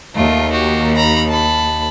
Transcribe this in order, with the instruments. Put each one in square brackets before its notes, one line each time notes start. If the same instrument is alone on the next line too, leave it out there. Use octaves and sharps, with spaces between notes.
[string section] D#2 [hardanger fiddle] A3 F4
[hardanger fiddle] F#4 G4
A#5 B5
A5 B5